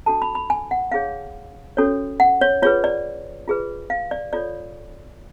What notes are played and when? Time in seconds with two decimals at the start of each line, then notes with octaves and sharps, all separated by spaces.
0.06 D4 F#4 A4 A5
0.22 B5
0.35 B5
0.50 G#5
0.71 F#5
0.92 D4 G#4 C#5 F5
1.77 C#4 F#4 A4 C#5
2.20 F#5
2.41 C#5
2.62 F4 G#4 B4 C#5
2.84 D5
3.48 F4 G#4 B4
3.90 F5
4.11 D5
4.33 F4 A4 C#5 D5